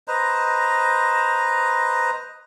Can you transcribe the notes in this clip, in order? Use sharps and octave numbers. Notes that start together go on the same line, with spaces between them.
B4 C5 D#5 A#5